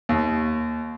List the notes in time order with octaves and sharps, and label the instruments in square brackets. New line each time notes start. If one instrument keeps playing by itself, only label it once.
[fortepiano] D#2